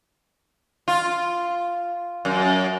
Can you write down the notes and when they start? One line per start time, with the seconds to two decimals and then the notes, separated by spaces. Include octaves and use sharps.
0.88 F4
2.25 F#2